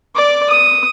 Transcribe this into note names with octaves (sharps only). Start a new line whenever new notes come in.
D5 D6
D#6